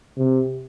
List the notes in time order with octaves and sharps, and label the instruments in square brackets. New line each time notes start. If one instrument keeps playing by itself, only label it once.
[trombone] C3